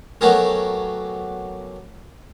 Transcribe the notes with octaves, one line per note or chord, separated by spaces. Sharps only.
F#3 A3 B3 G4 G#4 A#4